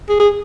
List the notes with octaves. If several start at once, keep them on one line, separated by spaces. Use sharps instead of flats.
G#4
G#4